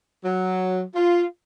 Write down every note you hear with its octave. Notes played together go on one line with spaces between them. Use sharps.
F#3
F4